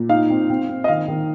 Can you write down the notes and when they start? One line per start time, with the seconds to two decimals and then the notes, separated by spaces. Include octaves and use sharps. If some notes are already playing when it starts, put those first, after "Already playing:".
Already playing: A#2
0.09 D#4 F5
0.30 C4
0.50 C4
0.69 C4
0.84 D#5
0.88 D#3 F5
1.08 D#3